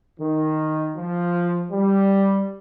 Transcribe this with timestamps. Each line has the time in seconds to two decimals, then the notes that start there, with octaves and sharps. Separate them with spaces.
0.19 D#3
0.95 F3
1.72 G3